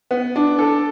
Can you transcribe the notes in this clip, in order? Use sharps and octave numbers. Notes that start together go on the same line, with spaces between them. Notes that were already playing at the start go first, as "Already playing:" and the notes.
B3
D4
A4